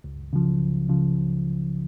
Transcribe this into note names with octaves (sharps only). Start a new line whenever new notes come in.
C#2
C#3 F3
C#2
C#3 F3
C#2